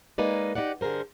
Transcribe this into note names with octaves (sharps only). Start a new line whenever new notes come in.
G#3 A#3 D#4 B4 D5
D#4 E4 G4 D5 F#5
G2 D3 G#4 A#4 C5